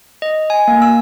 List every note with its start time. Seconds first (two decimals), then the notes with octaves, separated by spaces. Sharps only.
0.22 D#5
0.50 G#5
0.68 A#3
0.82 E6